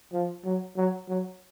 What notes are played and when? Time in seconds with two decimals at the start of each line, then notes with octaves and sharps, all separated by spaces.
0.13 F3
0.45 F#3
0.76 F#3
1.09 F#3